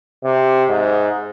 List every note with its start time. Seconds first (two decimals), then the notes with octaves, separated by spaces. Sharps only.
0.24 C3
0.69 G#2